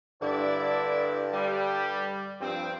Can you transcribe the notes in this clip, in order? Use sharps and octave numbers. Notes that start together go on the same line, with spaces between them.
G2 D3 E4 D5
G3
G2 F3 C4